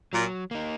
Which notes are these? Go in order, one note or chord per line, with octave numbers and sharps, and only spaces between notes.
A#2 F#3
A#3 D#4